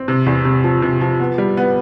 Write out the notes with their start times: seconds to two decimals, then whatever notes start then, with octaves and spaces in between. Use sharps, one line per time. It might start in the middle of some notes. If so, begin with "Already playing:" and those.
Already playing: C4
0.08 C3
0.26 E2
0.45 C3
0.64 F3
0.82 C3
1.01 F3
1.20 B3
1.38 G3
1.57 B3